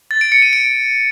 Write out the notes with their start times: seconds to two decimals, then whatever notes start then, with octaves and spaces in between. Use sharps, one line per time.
0.11 A6
0.21 D7
0.32 C#7
0.42 D#7
0.53 D7